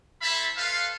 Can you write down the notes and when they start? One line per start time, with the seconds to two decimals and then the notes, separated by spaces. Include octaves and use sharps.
0.22 E4 A4 C5 E5 A5 B5
0.57 A4 B4 C5 F5